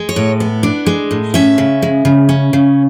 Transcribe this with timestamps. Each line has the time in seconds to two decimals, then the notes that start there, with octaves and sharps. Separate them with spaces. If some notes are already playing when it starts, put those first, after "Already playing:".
Already playing: G#3
0.09 C#5
0.16 A2
0.40 B3
0.63 D4
0.86 G#3
1.11 A2
1.34 C#4 E5
1.58 C#3
1.82 G#3
2.05 C#3
2.29 C#4
2.53 C#3